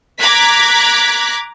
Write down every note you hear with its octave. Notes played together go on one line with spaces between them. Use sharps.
A#5 D6 F#6 G#6 B6